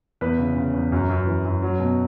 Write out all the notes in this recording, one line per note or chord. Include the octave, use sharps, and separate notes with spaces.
E2 B4
C#3
C#3
E2
F#2
F#2
E3
F#2
F#3
B2